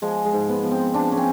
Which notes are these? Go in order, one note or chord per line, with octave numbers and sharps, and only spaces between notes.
F3 G#3
G#3
G#2
B3
F3
C4
F3 D4
C#4
C4